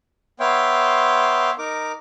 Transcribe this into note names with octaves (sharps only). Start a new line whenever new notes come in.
B3 C#5 E5 F5 G5 C6
D#4 A#4 D6